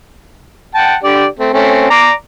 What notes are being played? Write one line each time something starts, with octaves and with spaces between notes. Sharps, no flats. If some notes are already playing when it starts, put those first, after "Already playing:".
F#5 G5 A5
D3 G4 D5
A3 C4
A3 C4 C#4
D5 A#5 D6